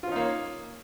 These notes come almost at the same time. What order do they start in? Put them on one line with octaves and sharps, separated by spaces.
F4 C#4 D#4 A#3 C#5